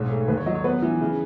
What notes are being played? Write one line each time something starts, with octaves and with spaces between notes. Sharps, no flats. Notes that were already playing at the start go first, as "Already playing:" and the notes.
Already playing: B1 G#2 C#5
A3
D#2 B4
C#5
F#3 D#5
C#5
B3 B4
E3
C#3